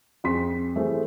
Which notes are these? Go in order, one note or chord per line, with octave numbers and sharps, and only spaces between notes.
F2 G#4 C6 B6
E3 A3 G4 G#4 C5